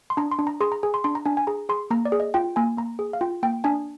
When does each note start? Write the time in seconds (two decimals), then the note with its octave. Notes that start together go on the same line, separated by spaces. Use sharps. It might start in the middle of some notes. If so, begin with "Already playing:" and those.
0.10 C6
0.17 D4 A#5
0.31 C6
0.39 D4
0.47 A#5
0.61 G#4 C6
0.72 A#5
0.83 G#4 G#5
0.94 C6
1.04 D4 C6
1.15 A#5
1.25 D4 G#5
1.37 G#5
1.47 G#4 A#5
1.69 G#4 C6
1.90 A#3 A#5
2.05 D5
2.12 G#4
2.20 D#5
2.34 F4 G5
2.56 A#3 G#5
2.77 A#3 A#5
2.99 G#4
3.13 F5
3.21 F4 G5
3.43 A#3 G5
3.64 D4 G#5